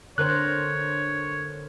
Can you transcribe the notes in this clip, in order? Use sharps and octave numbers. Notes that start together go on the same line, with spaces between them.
D3 A#4 C5 C#5 F#6